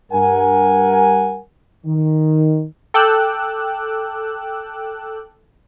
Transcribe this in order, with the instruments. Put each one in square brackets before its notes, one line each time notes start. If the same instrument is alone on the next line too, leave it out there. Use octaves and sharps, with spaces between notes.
[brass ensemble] G2 A#4 F#5 G#5
D#3
[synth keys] A4 G5 D6 E6 F#6